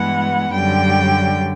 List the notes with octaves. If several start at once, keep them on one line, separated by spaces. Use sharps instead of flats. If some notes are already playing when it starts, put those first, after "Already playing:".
Already playing: G2 E3 G#3 B3 F#5
F#2 D3 G3 G5